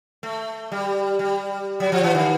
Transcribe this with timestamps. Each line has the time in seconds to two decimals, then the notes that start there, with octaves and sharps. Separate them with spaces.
0.23 A3
0.72 G3
1.19 G3
1.80 F#3
1.92 F3
2.03 E3
2.15 D#3